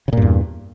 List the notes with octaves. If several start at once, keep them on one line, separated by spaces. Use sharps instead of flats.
E2 G2 A#2 C#3